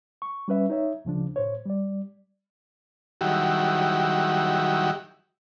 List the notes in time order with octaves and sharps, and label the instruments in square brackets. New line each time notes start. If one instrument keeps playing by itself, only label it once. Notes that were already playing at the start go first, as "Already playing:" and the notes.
[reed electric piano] C#6
G3 C#4 B4 E5
D#4 C#5 E5
D2 C#3 F3 D4
A2 C5 C#5
G3 D5
[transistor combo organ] D#3 F#3 G3 E4 F#4 G4